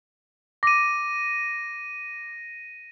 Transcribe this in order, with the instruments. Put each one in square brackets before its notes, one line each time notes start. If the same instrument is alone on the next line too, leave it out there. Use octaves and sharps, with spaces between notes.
[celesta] D6 [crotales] A#6 D#7